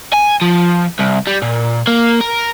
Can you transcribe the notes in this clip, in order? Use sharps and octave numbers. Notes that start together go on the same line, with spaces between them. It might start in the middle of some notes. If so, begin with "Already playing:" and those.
G#5
F3
C2
G3
A#2
A#3
A#4